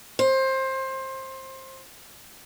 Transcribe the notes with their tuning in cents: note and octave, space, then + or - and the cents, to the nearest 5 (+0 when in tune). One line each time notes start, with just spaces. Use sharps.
C5 +20